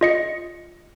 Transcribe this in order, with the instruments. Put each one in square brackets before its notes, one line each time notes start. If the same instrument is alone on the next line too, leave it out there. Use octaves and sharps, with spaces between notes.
[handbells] F4 D#5 C#7